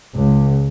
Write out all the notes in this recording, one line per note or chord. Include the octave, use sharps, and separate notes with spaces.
C#2